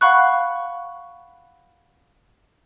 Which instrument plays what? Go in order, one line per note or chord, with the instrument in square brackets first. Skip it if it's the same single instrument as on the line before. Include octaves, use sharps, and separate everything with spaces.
[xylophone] F5 F#5 B5 C#6 F#6